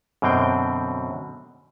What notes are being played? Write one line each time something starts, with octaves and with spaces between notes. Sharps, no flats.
F#2 B2 D3 C4 G5